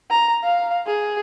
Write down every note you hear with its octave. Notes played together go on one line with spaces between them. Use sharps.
A#5
F5
G#4